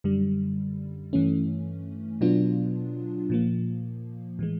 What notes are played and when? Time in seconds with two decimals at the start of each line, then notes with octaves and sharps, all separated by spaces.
0.04 F#2 D3 G3
1.13 G2 E3 A3 C#4
2.21 B2 F#3 B3 D4 F4
3.30 A#2 F3 A#3
4.39 A2 E3 G#3